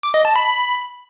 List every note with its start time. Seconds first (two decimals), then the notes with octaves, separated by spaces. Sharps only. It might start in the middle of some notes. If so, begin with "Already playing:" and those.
0.03 D6
0.14 D#5
0.25 A5
0.36 B5